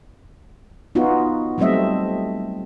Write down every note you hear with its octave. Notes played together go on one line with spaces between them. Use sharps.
B3 D#4 F4 F#4
F#3 G3 A3 C4 D#5 E5